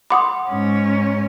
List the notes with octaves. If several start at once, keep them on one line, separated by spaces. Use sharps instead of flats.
F#5 B5 C6 D6 D#6
G#2 C#4